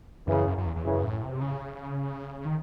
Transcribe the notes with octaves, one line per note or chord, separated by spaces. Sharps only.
F#2 C#3 E3
F#2
F#2
E2
E2
F#2 C#3 E3
A2
C3
C#3
D#3